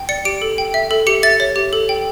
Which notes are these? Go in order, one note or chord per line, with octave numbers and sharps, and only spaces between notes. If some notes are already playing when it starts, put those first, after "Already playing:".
Already playing: G5
D5 C#7
G4 D7
A4
G5
E5
A4
G4 C#7
E5 A6
C#5
G4
A4
G5